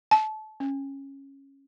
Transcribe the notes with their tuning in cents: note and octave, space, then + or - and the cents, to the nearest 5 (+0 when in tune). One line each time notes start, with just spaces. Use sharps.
A5 -25
C#4 -15